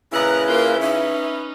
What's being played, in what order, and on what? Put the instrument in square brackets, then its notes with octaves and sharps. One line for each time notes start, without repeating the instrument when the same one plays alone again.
[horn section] A#2 D#5 A#5 [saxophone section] C#3 E4 [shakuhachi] B4 [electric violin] F#6
[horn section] A#3 [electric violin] F4 G6
[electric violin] C#4 D#4 [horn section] B4 [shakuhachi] E5